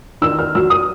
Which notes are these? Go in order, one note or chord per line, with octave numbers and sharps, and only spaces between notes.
D#3 E6
F6
F#3 E6
D#6